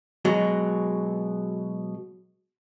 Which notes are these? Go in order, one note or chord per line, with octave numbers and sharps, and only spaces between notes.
B2 F#3 G#3